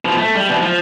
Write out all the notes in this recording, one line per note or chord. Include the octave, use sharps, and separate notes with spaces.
B2 F3
A3
G3
B2 E3
F3